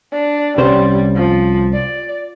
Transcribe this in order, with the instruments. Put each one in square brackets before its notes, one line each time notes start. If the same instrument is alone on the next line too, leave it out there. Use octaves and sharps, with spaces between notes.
[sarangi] D4
[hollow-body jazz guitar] C2 C#4 C5 [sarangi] G3
[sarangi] F3
D5